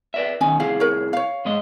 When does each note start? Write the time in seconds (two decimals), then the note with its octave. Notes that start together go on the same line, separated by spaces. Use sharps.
0.14 B4 D5 E5
0.41 D#3 C#4 D#4 G#5
0.60 C2 E4 G#4 F5
0.80 A#4 C#5
1.13 C#5 F5
1.45 G#2 G#3 D#5